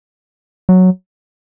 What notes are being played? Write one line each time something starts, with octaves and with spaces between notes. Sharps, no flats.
F#3